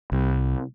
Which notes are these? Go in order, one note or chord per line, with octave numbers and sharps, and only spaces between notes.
C2